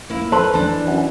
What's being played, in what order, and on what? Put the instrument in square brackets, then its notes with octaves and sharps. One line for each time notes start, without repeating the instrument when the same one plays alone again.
[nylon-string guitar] A#3 E4
[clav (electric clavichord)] A4 C5 [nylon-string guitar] B4
[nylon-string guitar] E3 D4
[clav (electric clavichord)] F#2